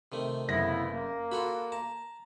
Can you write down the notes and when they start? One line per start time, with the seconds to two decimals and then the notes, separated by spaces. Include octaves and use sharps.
0.12 C3 D#3 A3
0.48 F#1 C#3 B3 E4 A#6
0.91 A#3
1.32 F4 F#4 A4 B5
1.72 A5 A#5